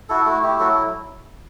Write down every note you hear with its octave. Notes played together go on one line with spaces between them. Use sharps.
E4 F#4 A4
A3 F#4
E4 G4
F#3 F#4 A4